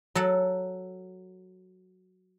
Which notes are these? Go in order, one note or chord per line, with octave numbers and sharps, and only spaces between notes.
F#3 A4 F#5 A5